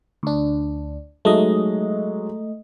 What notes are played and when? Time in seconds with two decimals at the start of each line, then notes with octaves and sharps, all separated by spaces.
0.23 D2 D4
1.25 F#3 G#3 A3 D#4 D#5